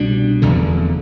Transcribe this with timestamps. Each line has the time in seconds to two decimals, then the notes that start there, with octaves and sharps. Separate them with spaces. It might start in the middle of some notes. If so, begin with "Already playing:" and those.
Already playing: C2 B2 G3 D4
0.42 F1 E2 D3